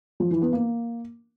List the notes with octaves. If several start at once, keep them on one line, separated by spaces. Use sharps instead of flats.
F3
E3
B3
A#3